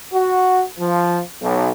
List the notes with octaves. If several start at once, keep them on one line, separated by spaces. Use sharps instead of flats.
F#4
F3
B1